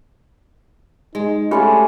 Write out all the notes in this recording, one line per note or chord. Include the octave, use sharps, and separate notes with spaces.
G#3 D#4
A3 C#4 G4 D5 F#5 B5 C6